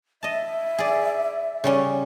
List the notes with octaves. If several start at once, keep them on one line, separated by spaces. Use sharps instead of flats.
D#5 E5 A5
G#4 D5
C#3 G3 C#4